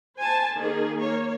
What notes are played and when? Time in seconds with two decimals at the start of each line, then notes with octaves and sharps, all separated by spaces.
0.19 C5 G#5 A5
0.57 D#3 A#3 G#4
0.99 A#3 C#5